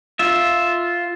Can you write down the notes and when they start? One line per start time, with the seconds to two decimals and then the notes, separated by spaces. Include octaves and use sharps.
0.19 F4 E5